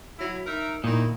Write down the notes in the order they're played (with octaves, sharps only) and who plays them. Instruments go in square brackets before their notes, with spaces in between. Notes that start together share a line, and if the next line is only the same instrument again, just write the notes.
[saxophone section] F#3 E4
D#4 A#4 E5
[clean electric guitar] A#2 [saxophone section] D#3 D#4 E4